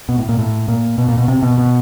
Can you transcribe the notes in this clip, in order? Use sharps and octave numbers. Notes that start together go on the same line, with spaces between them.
B2
A2
A#2
A2
A#2
B2
A#2
B2
C3
B2
B2